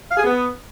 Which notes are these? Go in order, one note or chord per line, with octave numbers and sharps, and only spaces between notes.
F5
G#4
B3